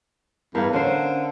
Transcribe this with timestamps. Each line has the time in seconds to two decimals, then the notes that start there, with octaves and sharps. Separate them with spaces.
0.55 E2 G2 A#4 F5
0.73 D3 C#4 C5